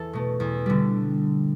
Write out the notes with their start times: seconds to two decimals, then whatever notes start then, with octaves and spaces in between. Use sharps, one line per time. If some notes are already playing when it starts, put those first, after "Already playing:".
Already playing: E2 E3 A4 A5
0.13 B2 A3
0.40 E2
0.66 D3 G3